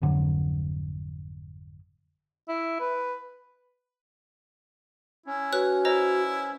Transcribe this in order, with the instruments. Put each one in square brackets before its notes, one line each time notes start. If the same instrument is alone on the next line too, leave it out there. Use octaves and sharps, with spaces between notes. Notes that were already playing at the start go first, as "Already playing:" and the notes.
[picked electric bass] G#1 F2 D3 F#3
[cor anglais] E4
B4
[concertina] C#4 [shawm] E4
[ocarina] F#4 [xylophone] B4 C#5 F#6
[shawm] E4 [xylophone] C5 D#5 A#5